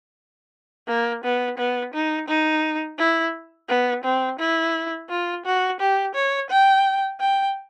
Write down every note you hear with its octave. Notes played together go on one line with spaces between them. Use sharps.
A#3
B3
B3
D#4
D#4
E4
B3
C4
E4
F4
F#4
G4
C#5
G5
G5